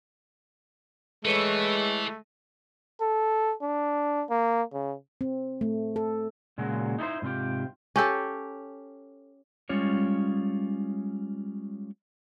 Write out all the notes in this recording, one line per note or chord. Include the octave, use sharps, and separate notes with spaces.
E3 G#3 A3 A4 B4 C#5
A4
D4
A#3
C#3
C4
A3
A4
A#2 C#3 F#3 G#3 F#4
D#4 E4 A4 C5
G#2 C3 C4 F4 G4
C#4 G4 A4
G3 G#3 C#4 F4 C#5